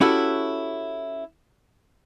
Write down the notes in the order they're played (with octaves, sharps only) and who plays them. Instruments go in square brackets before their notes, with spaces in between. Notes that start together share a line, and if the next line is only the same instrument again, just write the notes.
[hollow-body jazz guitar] C#4 E4 F#4 G4 A4